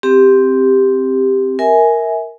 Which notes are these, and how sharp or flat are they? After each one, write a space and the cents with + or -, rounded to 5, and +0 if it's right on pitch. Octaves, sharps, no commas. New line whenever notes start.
C4 +0 G4 +5
A#4 +0 E5 -25 G#5 +5